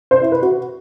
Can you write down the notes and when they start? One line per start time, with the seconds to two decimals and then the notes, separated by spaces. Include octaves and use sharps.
0.11 C5
0.22 E4
0.32 B4
0.42 F#4